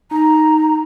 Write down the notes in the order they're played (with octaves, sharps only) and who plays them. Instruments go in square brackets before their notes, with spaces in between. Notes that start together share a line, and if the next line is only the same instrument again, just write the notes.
[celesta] D#4 [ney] A#5